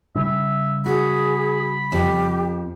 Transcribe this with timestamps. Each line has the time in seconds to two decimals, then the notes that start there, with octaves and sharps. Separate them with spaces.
0.16 C#3 G3 C#4 E5
0.86 F#4 G#4 B5
1.92 F2 F3 G4